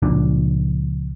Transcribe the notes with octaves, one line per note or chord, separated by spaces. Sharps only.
C#2 A#2 F3 D4